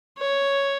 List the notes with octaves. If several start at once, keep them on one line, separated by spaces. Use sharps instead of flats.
C#5